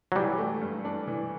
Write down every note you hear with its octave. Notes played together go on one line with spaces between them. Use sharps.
F#3
E3 G3
A3
G2
D4
E3